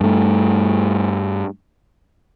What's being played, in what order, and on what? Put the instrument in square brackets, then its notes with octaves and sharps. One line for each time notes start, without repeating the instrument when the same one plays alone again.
[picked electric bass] G2 A3